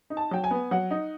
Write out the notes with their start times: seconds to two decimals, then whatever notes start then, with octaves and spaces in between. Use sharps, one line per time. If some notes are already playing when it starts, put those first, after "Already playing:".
0.10 D#4
0.17 A5
0.31 F#3 G5
0.44 G#5
0.51 B3
0.71 F#3 F#5
0.91 D#4